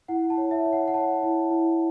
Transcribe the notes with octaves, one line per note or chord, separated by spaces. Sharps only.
E4 F#5
A5
C#5
E5
C#5
F#5
F#5
C#5 A5
E4
E4